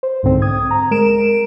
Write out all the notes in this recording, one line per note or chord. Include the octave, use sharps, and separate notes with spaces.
C5
C2 G#2 D3 C4 C5
D#6 G#6
A#5
G#3 A#4 D7 E7